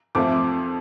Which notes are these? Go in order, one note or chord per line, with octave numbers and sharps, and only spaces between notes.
F2 F3 A3 D6